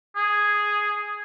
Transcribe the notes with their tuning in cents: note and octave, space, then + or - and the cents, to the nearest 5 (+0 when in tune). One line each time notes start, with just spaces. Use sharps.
G#4 +0